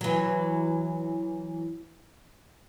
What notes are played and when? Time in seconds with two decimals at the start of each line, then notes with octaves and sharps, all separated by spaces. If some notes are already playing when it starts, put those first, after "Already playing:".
0.01 E3 F#3